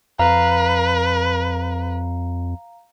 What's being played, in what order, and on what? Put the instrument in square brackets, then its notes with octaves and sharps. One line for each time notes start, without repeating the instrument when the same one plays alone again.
[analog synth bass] F2 [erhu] B4 [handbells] F5 A#5